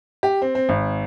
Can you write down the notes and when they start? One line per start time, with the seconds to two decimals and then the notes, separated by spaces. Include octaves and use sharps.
0.23 G4
0.42 C4
0.55 C4
0.69 G#1